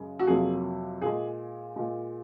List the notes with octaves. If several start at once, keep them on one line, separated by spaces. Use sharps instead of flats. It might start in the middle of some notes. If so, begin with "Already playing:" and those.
Already playing: F#2 C#3 G#3
F#4
F2 C3 F#3 A#3 G#4
A#2 G#3 G#4
A#2 G#3